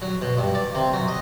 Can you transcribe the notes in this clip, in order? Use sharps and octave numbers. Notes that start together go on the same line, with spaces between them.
F#3
B2
G2
D5
C3
F#3
D#5